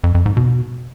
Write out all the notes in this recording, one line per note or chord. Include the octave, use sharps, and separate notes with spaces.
F2
F2
G#2
B2